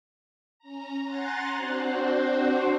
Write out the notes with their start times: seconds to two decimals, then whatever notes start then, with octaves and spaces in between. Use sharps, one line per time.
0.59 C#4 A#5
1.05 F#5 G#5 A#5 C6 F#6 A6
1.56 C4 D4 F#4 C5